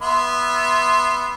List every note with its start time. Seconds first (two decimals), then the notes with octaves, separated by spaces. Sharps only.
0.02 B3 E5 C6